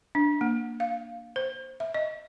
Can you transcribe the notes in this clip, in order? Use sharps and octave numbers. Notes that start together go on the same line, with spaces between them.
D4
A#3
F5
C5
E5
D#5